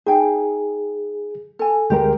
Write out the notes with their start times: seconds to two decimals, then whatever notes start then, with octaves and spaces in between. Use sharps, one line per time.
0.06 D#4 G#4 G5 G#5
1.59 A4 G#5
1.90 D2 G#3 G4 A#4